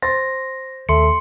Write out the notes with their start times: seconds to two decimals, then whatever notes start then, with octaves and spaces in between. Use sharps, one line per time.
0.02 C5 C6 A6 A#6
0.89 D#2 A3 C6 C#7